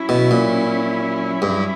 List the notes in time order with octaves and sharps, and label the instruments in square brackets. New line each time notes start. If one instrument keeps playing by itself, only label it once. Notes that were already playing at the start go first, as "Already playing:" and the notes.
Already playing: [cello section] F#3 C#4 E4
[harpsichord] B2
A#2
G2